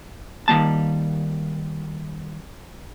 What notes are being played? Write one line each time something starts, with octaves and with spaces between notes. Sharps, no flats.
D#3 G3 A#3 A5